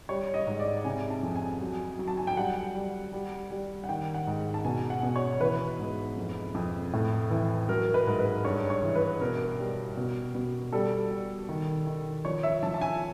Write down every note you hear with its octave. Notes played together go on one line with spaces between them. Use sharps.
G3 C#5
D#5
G#2
D5
C3 G#5
A5
F2
G#5
F#3
F#3
A5
G#5
G5
G3 F#5
G3
G3
G3
F#5
D#3 G5
F#5
G#2
A5
B2 G#5
F#5
B2
C#5
E3 B4
G#2
F2
F2
A2
E3
F#3 A#4
B4
G#2
B4
G2 C#5
C#5
E3
B4
B2 A#4
G3
B2
B2
G3 A4
G3
D#3
D#3
F3 C#5
E5
F3 A5
A5
G#5